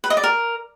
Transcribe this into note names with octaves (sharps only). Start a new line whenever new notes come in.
B4
D#5
D5
A#4